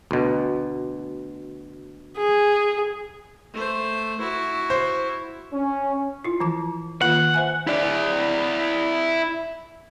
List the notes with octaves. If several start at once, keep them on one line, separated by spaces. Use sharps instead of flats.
D2 B2
G#4
A3 C5
E4 F#4
C5
C#4
E4 F4
E3 F3 A5
D#3 A#3 F4 F#5
C5 E5 G#5
E4 D5